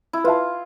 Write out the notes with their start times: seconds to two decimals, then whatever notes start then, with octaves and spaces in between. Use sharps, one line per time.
0.13 E4
0.24 F4 B4 E5 A5